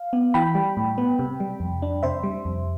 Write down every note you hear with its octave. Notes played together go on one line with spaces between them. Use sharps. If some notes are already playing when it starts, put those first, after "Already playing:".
Already playing: F5
B3
E3 G5 B5
G3
A2
B3
C3
G3
F2
D4
C3 C5 E5
G3
F2